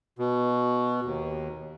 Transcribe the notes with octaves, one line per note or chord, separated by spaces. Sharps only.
B2
D#2